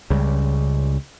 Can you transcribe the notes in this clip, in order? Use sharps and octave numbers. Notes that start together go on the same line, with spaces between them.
C#2 C#3 G3